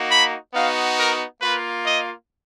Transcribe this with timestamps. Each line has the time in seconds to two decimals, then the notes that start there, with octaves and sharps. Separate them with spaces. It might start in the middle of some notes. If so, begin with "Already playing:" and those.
Already playing: A#3 D#4 F#4
0.10 B5
0.53 B3 D#4 F#4 F5
0.98 A#4
1.41 A#3 F4 B4
1.85 D#5